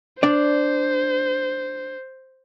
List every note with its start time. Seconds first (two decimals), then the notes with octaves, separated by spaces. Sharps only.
0.23 D4 C5 D5